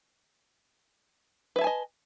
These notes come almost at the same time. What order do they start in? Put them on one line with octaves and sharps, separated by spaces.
B4 E5 A5 G#5 D#5